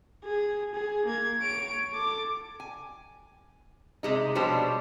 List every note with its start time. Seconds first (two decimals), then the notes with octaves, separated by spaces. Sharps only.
0.24 G#4
0.74 G#4
1.06 A#3 G#6
1.40 C#5 D7
1.93 A4 D6
2.60 G#5
4.03 C3 G#3 D#4
4.35 B2 F3 G3 D4 C5 C#5